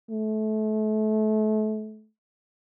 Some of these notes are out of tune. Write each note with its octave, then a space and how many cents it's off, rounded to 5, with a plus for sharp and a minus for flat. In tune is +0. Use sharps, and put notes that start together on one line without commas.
A3 -30